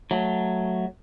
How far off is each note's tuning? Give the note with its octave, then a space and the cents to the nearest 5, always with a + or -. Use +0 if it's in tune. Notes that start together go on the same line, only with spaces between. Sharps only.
F#3 +0 A3 +0